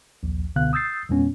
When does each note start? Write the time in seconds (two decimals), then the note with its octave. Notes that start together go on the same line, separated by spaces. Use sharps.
0.23 A#1 D#2
0.56 C#2 B2 D3 B3 F5 F#6
0.73 D#6 E6 G6 A6 C7
1.09 E2 A#2 G#3 B3 C#4